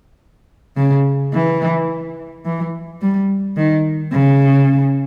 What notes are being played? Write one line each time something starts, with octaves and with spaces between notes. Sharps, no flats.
C#3
E3
E3
G3
D#3
C#3